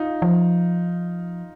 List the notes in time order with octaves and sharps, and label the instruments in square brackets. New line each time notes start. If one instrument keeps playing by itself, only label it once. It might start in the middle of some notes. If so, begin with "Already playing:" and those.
Already playing: [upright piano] D#4 F4
[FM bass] F3